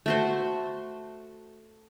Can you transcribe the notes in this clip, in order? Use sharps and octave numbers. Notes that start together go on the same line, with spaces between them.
A3 F#4 C5